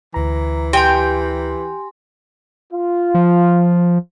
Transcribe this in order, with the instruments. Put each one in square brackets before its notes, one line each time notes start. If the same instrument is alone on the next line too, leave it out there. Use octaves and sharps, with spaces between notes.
[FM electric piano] D2 A#5 [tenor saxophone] E3
[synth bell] G4 G#5 C6 [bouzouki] G5
[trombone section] F4
[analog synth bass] F3